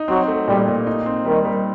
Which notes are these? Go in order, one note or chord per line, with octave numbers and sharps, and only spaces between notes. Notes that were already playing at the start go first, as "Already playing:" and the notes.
Already playing: D#4
F#3 C4
A3
A#2 G3
A#2
D#4
C4
D#3 G3
G3